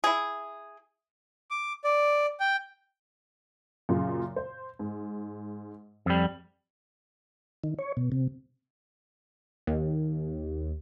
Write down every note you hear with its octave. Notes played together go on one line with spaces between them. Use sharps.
E4 G#4
D6
D5
G5
F#2 A#2 C#3
C5
G#2
F2 G3
D#3
C#5
B2
C3
D#2